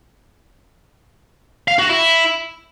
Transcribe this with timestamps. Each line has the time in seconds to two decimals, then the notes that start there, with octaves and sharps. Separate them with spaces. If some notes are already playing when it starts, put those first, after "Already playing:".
1.68 F5
1.79 F#4
1.89 E4